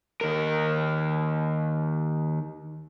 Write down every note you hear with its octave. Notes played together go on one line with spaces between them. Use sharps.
D#2 A#4